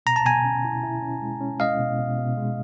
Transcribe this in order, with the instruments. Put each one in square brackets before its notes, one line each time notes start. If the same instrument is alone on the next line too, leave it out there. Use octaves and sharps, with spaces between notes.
[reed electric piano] B2 [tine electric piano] A#5
[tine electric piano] A5
[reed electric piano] B2 [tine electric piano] G#5 A#5
[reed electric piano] C#4
E4
E4
C#4
G#3
C#4
[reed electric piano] G#3 [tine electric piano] D#5 F5
[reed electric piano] B2
B2
B2
G#3